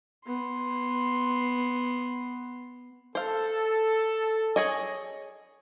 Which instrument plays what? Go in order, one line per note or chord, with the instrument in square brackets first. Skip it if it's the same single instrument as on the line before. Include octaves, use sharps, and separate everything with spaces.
[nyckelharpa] B3 C6
[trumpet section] A4 [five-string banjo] C5 F5
[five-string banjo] G#4 C#5 D#5